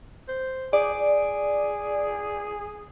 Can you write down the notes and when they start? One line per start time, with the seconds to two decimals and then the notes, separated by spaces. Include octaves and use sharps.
0.28 C5
0.73 G#4 D5